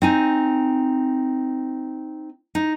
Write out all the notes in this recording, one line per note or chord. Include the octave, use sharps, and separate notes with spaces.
C4 D#4 G#5
D#4